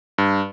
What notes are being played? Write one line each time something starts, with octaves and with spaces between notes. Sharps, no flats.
G2